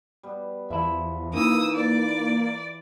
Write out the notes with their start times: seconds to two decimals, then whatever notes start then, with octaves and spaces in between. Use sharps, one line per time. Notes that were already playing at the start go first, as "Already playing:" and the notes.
0.23 G3 B3
0.70 E2 F3 E5 B5
1.34 E3 A#3 D#4 E4 D#6 E6
1.73 D5